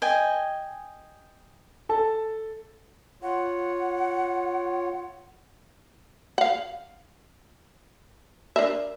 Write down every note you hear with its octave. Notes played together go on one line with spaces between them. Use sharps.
D#5 G5 G#5
A4 A5
F4 C#5 F#5
F5 F#5
D4 A#4 E5